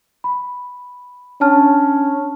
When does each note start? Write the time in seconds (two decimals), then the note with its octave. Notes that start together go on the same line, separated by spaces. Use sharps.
0.24 B5
1.41 C#4 D4 A5 F6